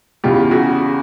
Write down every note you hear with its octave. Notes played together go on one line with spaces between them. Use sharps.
E2 C#3 E3 F4 G4
F#4 G#4